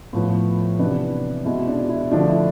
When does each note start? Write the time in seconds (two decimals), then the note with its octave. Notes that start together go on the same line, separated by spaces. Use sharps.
0.13 A2 F3 B3
0.79 C3 E3 B3 D4
1.45 B2 G#3 B3 E4
1.67 D4
1.89 E4
2.12 D3 F3 A3 D4
2.29 E4